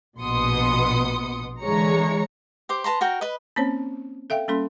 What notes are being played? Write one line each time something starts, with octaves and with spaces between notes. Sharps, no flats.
A#1 B2 B3 C6 D#6 C#7
D3 E3 G#3 C#5 A#5 C#7
G4 C5 D6
B4 A5 A#5 C6
F#4 A#4 G5
B4 D#5
A#3 C4 C#4 C5 C#5 A5
A4 E5 F5 G5
G3 A#3 C#4 A4 C6